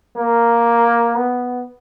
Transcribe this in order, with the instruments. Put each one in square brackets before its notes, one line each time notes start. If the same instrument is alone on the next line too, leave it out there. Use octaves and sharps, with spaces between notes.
[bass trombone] A#3
B3